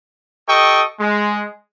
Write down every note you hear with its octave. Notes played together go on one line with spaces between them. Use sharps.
G4 A4 D#5 G5 C#6 D#6
G#3